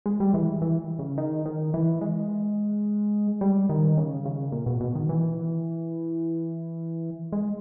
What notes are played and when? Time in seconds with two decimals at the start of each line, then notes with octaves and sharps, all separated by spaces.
0.06 G#3
0.20 G3
0.34 E3
0.62 E3
0.99 C#3
1.18 D#3
1.46 D#3
1.74 E3
2.01 G#3
3.41 G3
3.69 D#3
3.97 C#3
4.25 C#3
4.52 A#2
4.66 B2
4.81 B2
4.95 D#3
5.09 E3
7.32 G#3